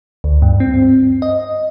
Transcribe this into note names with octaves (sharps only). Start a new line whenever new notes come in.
D2
G2
C4
D#5